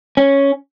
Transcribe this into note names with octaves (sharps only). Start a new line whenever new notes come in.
C#4